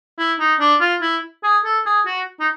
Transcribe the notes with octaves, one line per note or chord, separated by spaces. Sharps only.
E4
D#4
D4
F4
E4
G#4
A4
G#4
F#4
D#4